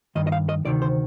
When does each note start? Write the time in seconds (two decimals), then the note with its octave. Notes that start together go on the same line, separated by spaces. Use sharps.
0.15 G2 D#3 D#5
0.27 D#5
0.32 F5
0.49 D#5
0.65 D2 C3 D#3 D5
0.82 C5